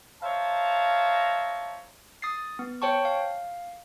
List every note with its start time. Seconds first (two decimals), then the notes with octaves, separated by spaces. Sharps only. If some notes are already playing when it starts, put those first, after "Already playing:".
0.22 C5 C#5 E5 F5 A5 A#5
2.22 D#6 A6 C7
2.59 B3
2.82 C5 C#5 G5 A5 C#6
3.05 F5